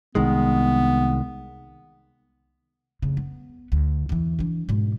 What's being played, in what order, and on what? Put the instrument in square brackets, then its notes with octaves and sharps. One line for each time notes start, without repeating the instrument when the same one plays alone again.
[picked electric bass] C2 D#3 G#3 [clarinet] B3
[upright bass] F1 C#3
B3
D2
E2 E3
E3 D4
G#2 B2